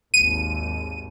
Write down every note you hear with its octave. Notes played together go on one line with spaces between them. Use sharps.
G#1 D#2 D#7